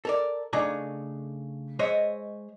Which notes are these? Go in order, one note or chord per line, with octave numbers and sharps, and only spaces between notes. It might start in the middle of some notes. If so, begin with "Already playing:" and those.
A4 A#4 D5
C#3 A3 D4 D#4 G#5 A#5
G#3 C5 C#5 D#5 E5